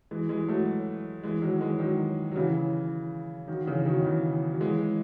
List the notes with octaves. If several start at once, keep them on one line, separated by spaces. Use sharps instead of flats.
E3 G#3
E3 G#3
F#3 A3
E3 G#3
D#3 F#3
E3 G#3
D#3 F#3
F#3
C#3 E3
D#3 F#3
C#3 E3
B2 D#3
C#3 E3
F#3
E3 G#3